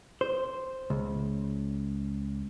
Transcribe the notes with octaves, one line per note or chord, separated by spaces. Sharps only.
C5
C#2